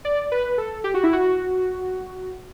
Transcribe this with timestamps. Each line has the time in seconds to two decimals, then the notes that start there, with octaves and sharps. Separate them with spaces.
0.05 D5
0.32 B4
0.58 A4
0.84 G4
0.94 F#4
1.03 E4
1.13 F#4